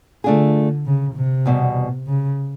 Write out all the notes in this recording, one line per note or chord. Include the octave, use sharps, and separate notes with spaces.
D3 A3 D4 F4 G#4
C#3
C3
E2 B2 G3
C#3